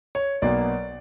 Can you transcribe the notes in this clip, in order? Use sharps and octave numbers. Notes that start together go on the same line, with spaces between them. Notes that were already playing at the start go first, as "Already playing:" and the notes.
C#5
B1 B2 F#3 A#3 D5